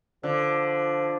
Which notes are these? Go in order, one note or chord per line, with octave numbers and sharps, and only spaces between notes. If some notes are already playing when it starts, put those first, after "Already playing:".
D3 F3